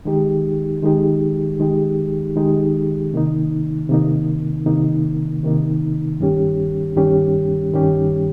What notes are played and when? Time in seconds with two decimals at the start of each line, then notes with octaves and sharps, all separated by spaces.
0.05 D#3 G#3 D#4 G4
0.83 D#3 G#3 D#4 G4
1.59 D#3 G#3 D#4 G4
2.36 D#3 G#3 D#4 G4
3.13 C3 D#3 A#3 D#4
3.89 C3 D#3 A#3 D#4
4.66 C3 D#3 A#3 D#4
5.43 C3 D#3 A#3 D#4
6.19 G2 D#3 G3 C#4 G4
6.96 G2 D#3 G3 C#4 G4
7.74 G2 D#3 G3 C#4 G4